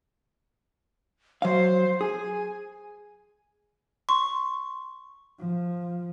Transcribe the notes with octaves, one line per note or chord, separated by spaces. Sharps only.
F#3 C5 F5
G#4 G#5
C6 C#6
F3